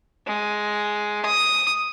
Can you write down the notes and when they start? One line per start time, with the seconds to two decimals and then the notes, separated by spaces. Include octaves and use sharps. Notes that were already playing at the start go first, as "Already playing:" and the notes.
0.27 G#3
1.26 D#6